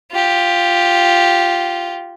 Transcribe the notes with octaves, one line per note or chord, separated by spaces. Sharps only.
F4 G4